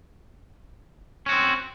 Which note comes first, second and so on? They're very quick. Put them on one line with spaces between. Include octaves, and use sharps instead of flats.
C#4 F#4 C4